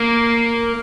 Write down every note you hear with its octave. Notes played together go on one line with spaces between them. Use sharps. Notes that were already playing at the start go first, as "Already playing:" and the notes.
Already playing: A#3